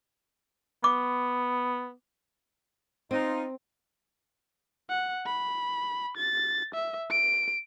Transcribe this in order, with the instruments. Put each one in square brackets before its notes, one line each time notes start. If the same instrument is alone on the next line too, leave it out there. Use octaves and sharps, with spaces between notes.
[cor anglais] B3 [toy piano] D6
[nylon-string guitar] C4 [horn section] D#4 F4
[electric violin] F#5
B5
A6
E5
D7